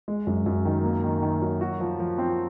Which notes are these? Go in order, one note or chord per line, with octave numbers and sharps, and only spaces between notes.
G#3
F#2
F#2
D#3
A#3
D#3
D#3
F#3
F#4
F3
F3
C4